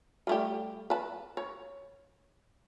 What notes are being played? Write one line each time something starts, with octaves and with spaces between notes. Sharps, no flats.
G3 A3 G4
B4 A5
C#5